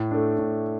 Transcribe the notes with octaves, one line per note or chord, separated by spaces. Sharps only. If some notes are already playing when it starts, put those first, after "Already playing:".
Already playing: A2
A3 D4
A2